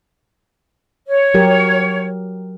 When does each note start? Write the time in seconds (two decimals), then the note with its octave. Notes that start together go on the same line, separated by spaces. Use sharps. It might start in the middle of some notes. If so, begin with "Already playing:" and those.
1.07 C#5
1.34 F#3 G4 A#4